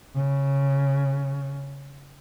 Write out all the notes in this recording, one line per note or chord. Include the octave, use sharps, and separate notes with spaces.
C#3